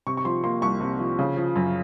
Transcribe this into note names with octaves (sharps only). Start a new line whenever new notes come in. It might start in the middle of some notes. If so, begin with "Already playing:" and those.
C3 C#6
C#6
F3 C6
A#3 C6
C2 C#6
C3
F3
C#3
F3
F#2